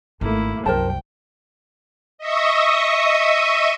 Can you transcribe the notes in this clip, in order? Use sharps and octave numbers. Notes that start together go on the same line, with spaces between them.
G#1 A3 A#3 E4
C2 F#2 A#4 C5 G5 A5
D#5 E5 C#6 D#6